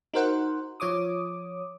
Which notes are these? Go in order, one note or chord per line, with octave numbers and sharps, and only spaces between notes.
D#4 F#4 A#4 C5 F#5
F3 C#5 D6 D#6